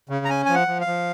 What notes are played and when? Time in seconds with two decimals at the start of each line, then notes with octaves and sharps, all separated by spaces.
0.09 C#3
0.25 A#5
0.29 C#4 G#5
0.46 F3 G#5
0.55 F#5
0.68 F3
0.81 F5
0.87 F3